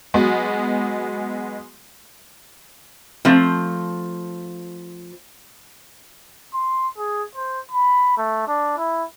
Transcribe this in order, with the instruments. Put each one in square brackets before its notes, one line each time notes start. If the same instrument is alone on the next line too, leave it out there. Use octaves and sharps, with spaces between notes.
[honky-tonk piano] F#3 G#3 B3
[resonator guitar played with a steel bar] F3 A3 C4
[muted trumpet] C6
G#4
C5
B5
A3
D4
E4